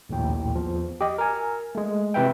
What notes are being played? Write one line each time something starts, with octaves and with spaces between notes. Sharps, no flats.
A#1 D#2 A2 G5
E2 F3
G4 D#5
A#4 G#5
G#3 A3
C3 E3 B4 E5 G5